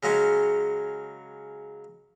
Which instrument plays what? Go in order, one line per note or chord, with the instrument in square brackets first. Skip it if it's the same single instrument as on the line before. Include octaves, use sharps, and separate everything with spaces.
[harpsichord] C#3 F#3 G#3 C#4